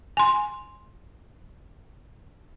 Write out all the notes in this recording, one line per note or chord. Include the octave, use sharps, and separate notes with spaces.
G#5 C6